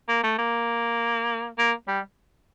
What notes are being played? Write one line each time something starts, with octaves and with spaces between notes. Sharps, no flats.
A#3
A3
A#3
A#3
G3